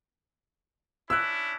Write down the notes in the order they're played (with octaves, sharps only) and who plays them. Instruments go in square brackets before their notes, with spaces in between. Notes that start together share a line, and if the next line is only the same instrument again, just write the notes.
[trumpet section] C#4 D4 E4 [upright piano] E6 F#6